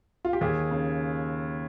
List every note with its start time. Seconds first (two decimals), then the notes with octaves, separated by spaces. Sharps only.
0.25 F4
0.33 G4
0.41 D#2 G#4
0.71 C#3